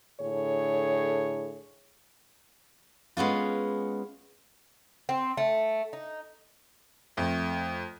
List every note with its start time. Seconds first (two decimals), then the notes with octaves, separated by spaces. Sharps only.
0.21 A2 D3 G#4 C#5
3.17 G#3 B3 C#4 F4
5.09 C4
5.37 A3
5.93 D#4
7.17 F2 A3